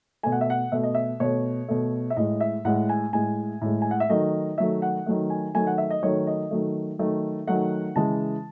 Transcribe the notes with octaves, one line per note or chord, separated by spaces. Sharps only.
B2 A3 G#5
F#5
E5
F#5
B2 A3 E5
D#5
E5
B2 A3 C#5
B2 A3
E5
A2 G#3 D#5
E5
A2 G#3 F#5
G#5
A2 G#3 G#5
A2 G#3
G#5
F#5
E5
D#3 F#3 A3 D#5
D#3 F#3 A3 E5
F#5
D#3 F#3 A3
G#5
D#3 F#3 A3 G#5
F#5
E5
D#5
D#3 F#3 A3 C#5
D#5
D#3 F#3 A3
D#3 F#3 A3
D#3 F#3 A3 F#5
C#3 E3 G#3 A5